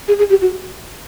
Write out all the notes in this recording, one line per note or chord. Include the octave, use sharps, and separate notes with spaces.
G#4
G#4
G4
F#4